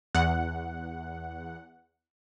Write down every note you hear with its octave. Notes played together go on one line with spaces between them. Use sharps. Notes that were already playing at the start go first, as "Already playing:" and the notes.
E2 F#5